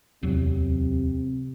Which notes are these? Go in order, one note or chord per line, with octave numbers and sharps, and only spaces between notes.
D1 E2 C3 F#3